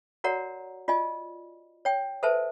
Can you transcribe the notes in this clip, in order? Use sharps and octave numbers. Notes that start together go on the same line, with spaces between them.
F#4 A#4 C#5 D5 F#5 A#5
F4 D5 D#5 G#5
C#5 G5
A4 B4 C5 E5 G#5 A5